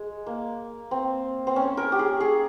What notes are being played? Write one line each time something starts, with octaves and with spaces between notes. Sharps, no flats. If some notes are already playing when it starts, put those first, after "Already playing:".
Already playing: G#3
A#3
C4
C4
C#4
A#4
G4
G#4
G#4